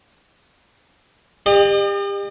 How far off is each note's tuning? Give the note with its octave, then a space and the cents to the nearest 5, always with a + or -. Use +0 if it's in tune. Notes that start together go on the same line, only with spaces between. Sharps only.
G4 +30 D#5 -45